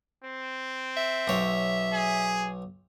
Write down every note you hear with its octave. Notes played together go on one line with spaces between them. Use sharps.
C4
E5
B1 C#5
G#4